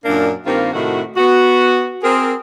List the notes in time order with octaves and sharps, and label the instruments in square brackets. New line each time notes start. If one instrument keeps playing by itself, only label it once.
[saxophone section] F#2 A#2 A#3 D4
G2 D#3 G3 A#3 C4 F4
A2 C3 D#3 A3 F#4
B3 F#4
C4 G#4 A#4